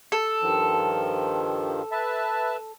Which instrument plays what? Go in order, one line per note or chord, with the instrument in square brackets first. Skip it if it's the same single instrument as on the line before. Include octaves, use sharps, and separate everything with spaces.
[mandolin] A4
[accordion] G2 D#3 F3
B4 E5 A5